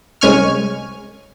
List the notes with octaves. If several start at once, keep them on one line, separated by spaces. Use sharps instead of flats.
C2 G#3 C#4 G#5 C#6 F6